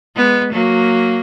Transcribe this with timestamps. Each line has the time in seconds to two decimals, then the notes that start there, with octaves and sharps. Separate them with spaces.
0.16 G#3 B3
0.52 F#3 A#3